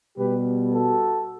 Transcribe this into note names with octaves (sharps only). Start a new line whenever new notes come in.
B2 G3 B3 G4 B4
F#4 A4